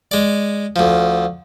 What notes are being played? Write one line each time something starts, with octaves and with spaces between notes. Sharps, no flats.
G#3 D5
D2 F3